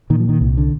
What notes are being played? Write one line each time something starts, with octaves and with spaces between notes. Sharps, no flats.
A#2 D#3
F3
D#3
C2
D3